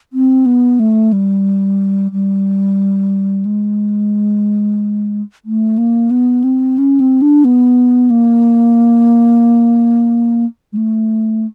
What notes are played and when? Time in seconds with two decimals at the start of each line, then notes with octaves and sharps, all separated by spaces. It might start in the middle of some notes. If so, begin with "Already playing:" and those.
0.13 C4
0.46 B3
0.80 A3
1.13 G3
2.12 G3
3.45 G#3
5.45 A3
5.78 A#3
6.11 B3
6.44 C4
6.78 C#4
7.00 C4
7.22 D4
7.45 B3
8.10 A#3
10.73 G#3
10.77 A3